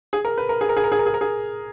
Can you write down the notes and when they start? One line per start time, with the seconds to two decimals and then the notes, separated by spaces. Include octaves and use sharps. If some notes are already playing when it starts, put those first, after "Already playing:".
0.13 G#4
0.25 A#4
0.38 B4
0.49 A#4
0.61 G#4
0.69 A#4
0.77 G#4
0.84 A#4
0.92 G#4
0.99 A#4
1.06 G#4
1.14 A#4
1.21 G#4